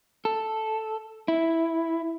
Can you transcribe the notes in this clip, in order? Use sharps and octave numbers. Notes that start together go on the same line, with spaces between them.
A4
E4